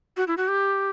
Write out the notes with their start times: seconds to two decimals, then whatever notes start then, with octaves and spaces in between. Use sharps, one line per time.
0.17 F#4
0.28 E4
0.37 F#4
0.48 G4